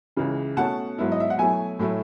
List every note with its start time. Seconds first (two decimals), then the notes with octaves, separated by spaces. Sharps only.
0.17 C#2 C#3 E3
0.57 B2 A3 C#4 F#5 A5
0.98 G#2 F#3 B3 E4
1.12 D#5
1.20 E5
1.30 F#5
1.38 B2 F#3 A3 E4 E5 G#5
1.79 A2 F#3 A3 E4